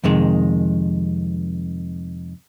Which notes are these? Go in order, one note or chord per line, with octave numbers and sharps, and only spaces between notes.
F2 C3 D#3 G#3